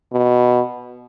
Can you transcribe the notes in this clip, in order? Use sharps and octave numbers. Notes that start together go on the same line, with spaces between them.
B2